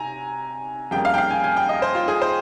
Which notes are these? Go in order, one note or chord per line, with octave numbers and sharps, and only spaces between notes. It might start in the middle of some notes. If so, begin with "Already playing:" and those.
Already playing: C3 G#5 A#5
F2 C#3 G3 A#3 G5
F5
G5
F5
G#5
G#5
G5
D#5
C5
F4
G#4
C5